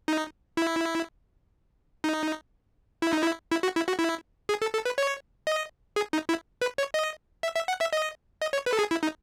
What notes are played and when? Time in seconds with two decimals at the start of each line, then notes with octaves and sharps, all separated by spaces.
0.08 D#4
0.57 E4
2.04 D#4
3.02 E4
3.13 D#4
3.23 E4
3.51 E4
3.63 F#4
3.76 E4
3.88 F#4
4.00 E4
4.49 G#4
4.62 A4
4.74 A4
4.85 B4
4.98 C#5
5.47 D#5
5.96 G#4
6.13 D#4
6.29 E4
6.61 B4
6.78 C#5
6.94 D#5
7.43 E5
7.55 E5
7.68 F#5
7.81 E5
7.93 D#5
8.42 D#5
8.53 C#5
8.66 B4
8.73 A4
8.79 G#4
8.91 E4
9.03 D#4